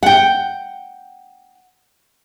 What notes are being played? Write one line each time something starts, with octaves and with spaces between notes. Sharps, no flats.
F#5 G5